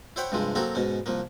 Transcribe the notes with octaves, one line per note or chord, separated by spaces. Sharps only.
E4 C5 C#5 F#5 G5 B5
G2 C3 F3 G#3 E4
F#3 A#3 C4 F#4 A4
G#2 B2 C#4
C2 F3 A#3